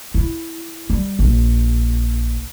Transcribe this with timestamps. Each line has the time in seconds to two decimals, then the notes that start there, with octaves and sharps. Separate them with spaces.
0.14 E4
0.90 G3
1.19 A#1